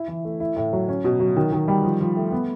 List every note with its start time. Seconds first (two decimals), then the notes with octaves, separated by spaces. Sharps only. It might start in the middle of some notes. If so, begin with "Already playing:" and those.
Already playing: E4
0.08 E3
0.25 A3
0.40 E4
0.56 A2
0.73 F#3
0.89 C#4
1.04 B2
1.20 F#3
1.36 D#3
1.52 D#3
1.68 G3
1.84 F3
2.01 F3
2.17 A3
2.32 B3